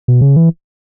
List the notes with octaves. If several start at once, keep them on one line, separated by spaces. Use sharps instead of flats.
B2
C#3
E3